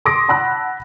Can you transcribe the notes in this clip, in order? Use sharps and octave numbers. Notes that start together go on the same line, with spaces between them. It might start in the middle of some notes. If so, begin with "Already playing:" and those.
C6 D6 D#6 A#6 D7
F#5 A5 B5 E6 F#6